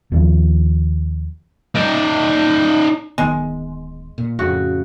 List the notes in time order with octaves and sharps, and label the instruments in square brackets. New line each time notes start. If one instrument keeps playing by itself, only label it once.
[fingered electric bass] D#2 F3
[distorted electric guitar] D#4 D5
[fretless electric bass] D1 D#3 B3 [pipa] G#3
[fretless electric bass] A#2
[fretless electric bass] F2 A2 [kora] C#3 F#4